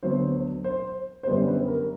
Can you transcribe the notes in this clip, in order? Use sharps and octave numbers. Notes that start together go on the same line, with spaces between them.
D2 D3 F#3 B3 C5
C5
C5
F#2 D3 G3 B3 B4
B4
A#4